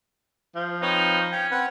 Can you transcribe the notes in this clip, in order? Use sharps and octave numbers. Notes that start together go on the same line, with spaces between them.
F3
C4 D#4 B4 C#5
C#4 G5
C4 B4 F#5